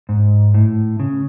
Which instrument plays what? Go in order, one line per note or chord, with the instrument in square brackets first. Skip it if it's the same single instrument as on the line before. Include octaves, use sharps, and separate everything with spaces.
[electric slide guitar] G#2
A2
C#3